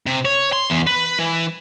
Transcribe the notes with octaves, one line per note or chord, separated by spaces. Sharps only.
C3
C#5
C6
E2
B4
E3